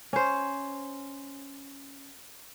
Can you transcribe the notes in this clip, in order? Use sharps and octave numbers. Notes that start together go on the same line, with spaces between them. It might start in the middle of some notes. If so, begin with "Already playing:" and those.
C#4 C5